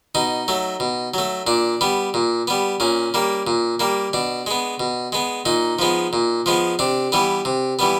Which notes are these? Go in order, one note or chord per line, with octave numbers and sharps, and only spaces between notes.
B2 D#4
F#3 A3
B2
F#3 A3
A#2 D4
G3 B3
A#2
G3 B3
A#2 C#4
G3 A#3
A#2
G3 A#3
B2 D4
G#3 B3
B2
G#3 B3
A#2 D#4
F3 G#3 B3
A#2
F3 G#3 B3
C3 D4
E3 G3 B3
C3
E3 G3 B3